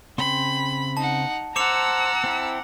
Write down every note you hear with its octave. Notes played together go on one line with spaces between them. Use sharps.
C#3 C4 B5 C6
D#4 F#5 A5
C5 F#5 A5 A#5 D6 E6 C#7 F7
C4 E4